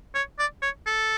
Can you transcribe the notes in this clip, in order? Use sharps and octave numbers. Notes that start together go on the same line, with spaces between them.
C#5
D5
C#5
A4